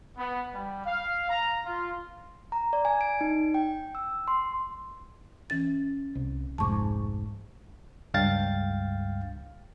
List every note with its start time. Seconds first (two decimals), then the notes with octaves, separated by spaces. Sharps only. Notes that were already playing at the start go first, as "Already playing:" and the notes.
0.17 B3
0.53 G3
0.85 F5
1.29 A#5
1.65 F4
2.52 A#5
2.73 D5
2.85 G#5
3.01 D7
3.21 D#4
3.54 G5
3.95 E6
4.28 C6
5.50 E3 C#4 A6
6.15 C2
6.58 F1 C2 G#2 A5 C#6 D6
8.14 C#2 G2 F5 G5 A6